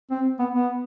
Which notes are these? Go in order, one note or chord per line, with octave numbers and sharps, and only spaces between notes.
C4
B3
B3